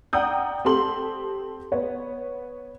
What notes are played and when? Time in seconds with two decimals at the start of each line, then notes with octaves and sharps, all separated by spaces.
0.13 D5 F#5 G5 A#5 D#6 G6
0.65 C4 G4 A4 C6 F#7
1.72 B3 C#5